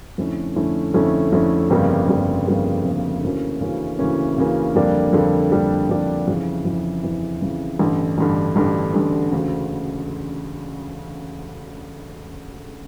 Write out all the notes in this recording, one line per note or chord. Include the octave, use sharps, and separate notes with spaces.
F2 D3 A3 C#4 E4
F2 D3 A3 C#4 E4
F2 D3 A3 C#4 E4
F2 D3 A3 C#4 E4
G1 F2 C#3 G3 A#3
G1 F2 C#3 G3 A#3
G1 F2 C#3 G3 A#3
G1 F2 C#3 G3 A#3
D2 C#3 E3 A#3 C#4
D2 C#3 E3 A#3 C#4
D2 C#3 E3 A#3 C#4
D2 C#3 E3 A#3 C#4
F2 D3 G3 A#3 D4
F2 D3 G3 A#3 D4
F2 D3 G3 A#3 D4
F2 D3 G3 A#3 D4
F2 C#3 E3
F2 C#3 E3
F2 C#3 E3
F2 C#3 E3
A1 G2 D3
A1 G2 D3
A1 G2 D3
A1 G2 D3
E1 D2 C#3